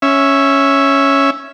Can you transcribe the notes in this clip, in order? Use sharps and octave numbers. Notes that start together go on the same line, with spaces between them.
C#4 E5